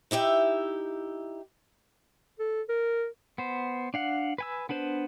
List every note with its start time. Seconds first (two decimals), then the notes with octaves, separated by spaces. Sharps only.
0.11 D#4 E4 G4 E5
2.39 A4
2.69 A#4
3.38 B3 C5
3.94 D4 F5 F#5
4.38 B4 G#5 E6
4.69 B3 D4 B4 C5